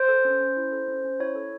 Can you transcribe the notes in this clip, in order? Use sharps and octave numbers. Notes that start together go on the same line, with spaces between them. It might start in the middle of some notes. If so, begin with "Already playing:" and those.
Already playing: C5
A4
C#4
C#4
E4
A4
C#4
C#4
E4 C#5
A4